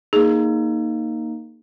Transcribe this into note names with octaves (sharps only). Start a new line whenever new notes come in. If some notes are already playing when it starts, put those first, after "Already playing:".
A#3 D#4 G#4